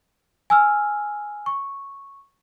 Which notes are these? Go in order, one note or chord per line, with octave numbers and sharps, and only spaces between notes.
G#5 E6 F6
C#6